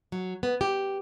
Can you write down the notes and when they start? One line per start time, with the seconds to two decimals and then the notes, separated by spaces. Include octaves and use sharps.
0.12 F#3
0.43 B3
0.61 G4